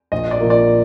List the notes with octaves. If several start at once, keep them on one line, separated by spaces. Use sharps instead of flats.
A#1 D#5
D5
A#2 F3 A#3
D5